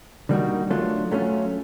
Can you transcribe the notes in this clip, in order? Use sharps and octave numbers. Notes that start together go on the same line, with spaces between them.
D3 G3 A#3 D#4 F#4
F#3 A3 D4 F4
F#3 A3 C#4 F4